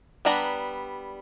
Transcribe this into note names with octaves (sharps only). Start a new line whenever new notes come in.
G3 B3 D4 A#5